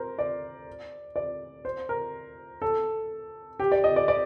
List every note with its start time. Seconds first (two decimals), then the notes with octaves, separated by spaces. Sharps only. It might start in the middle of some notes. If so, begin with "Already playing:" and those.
Already playing: A#4 C5
0.19 D5
1.16 D5
1.65 C5
1.89 A#4
2.62 A4
3.59 G4
3.72 D5
3.84 D#5
3.96 D5
4.08 D5